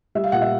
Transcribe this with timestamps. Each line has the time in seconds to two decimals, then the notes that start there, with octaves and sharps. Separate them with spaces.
0.15 G3 E5
0.24 F5
0.32 A#2 F#5
0.42 E5